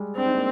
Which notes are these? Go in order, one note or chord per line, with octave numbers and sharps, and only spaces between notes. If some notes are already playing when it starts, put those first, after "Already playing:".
Already playing: G3 G#3
C4 D4
D#4
A#3 D4